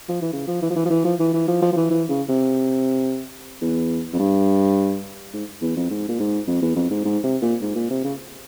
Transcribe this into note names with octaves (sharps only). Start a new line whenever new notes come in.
F3
E3
C#3
F3
E3
F3
E3
F3
E3
F3
E3
E3
F3
F3
F3
E3
E3
C#3
C3
E2
F2
G2
G#2
E2
F2
G#2
A#2
G#2
F2
E2
F2
G#2
G#2
C3
A#2
G#2
A#2
C3
C#3